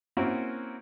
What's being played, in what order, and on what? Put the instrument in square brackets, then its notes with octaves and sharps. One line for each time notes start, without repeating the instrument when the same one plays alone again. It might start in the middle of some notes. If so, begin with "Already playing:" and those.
[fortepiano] A#3 C4 C#4 E4 F#4 A#4